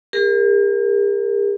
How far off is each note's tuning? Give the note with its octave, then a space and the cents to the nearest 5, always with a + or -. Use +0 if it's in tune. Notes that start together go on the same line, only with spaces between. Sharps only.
G4 +45 A#4 -5